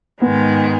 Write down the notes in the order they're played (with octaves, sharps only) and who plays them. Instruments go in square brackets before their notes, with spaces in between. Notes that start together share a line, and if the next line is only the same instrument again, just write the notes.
[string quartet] G#2 D#3 G#3 [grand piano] B3